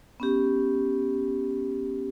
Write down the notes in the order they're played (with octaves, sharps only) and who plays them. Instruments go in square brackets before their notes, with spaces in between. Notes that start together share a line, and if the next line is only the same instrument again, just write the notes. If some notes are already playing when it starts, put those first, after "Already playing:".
[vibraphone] B3 C#4 G4